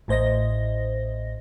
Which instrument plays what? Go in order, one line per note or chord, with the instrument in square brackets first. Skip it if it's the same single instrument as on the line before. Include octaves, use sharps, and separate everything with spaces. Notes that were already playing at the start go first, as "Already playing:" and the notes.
[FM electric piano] A1 A2 C5 D#5 A#6